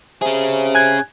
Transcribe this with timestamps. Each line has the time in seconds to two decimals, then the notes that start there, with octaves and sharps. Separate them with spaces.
0.22 C3 C#4 G#4
0.75 G#5 F#6 G#6